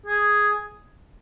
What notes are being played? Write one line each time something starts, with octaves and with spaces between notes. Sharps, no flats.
G#4